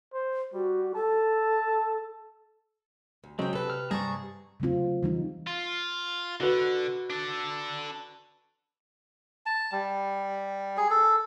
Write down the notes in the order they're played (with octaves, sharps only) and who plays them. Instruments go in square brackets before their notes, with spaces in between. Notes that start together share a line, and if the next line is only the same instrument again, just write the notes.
[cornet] C5
[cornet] G3 [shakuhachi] F#4
[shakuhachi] A4 [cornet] A5
[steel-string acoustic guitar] D2
[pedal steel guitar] C#3 F#3 G#3 [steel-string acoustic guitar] C4 G5
[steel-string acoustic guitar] C3 B4 [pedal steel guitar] A4
[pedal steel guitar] F6
[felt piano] G2 [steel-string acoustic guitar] C3 A5 A#5 [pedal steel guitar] G#4 C#6
[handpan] C#3 F#3 A3 C4 F4
E3 G3 D#4
[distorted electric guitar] F4
[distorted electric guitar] D3 [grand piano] F#4 B4
[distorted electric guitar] D4 A4
[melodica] A5
G3
G#4
A4